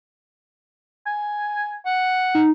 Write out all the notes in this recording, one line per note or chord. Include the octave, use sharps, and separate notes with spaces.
G#5
F#5
D#4